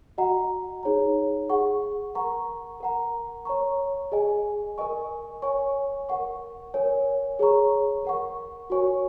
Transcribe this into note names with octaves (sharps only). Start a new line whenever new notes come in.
F#4 D#5 F#5 A#5
D#4 G#4 C#5 A#5
G#4 F#5 C#6
A#4 F#5 A#5 C#6
A#4 F#5 A#5
C#5 A#5 C#6
G#4 D#5 G#5
A#4 D#5 G#5 C#6
C#5 G#5 C#6
A#4 F#5 C#6
A#4 C#5 G#5
G#4 C#5 A#5 C#6
A#4 F#5 C#6
F#4 A#4 C#5 G#5 C#6